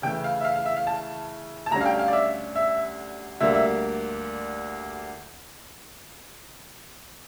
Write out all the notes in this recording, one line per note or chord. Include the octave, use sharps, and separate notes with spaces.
C#3 E3 A3 E4 G5
F5
E5
F5
F5
E5
F5
A5
A5
D2 D3 G3 C#4 A#5
F5
G5
F5
D5
E5
E5
D2 D3 G3 A#3 E5
E5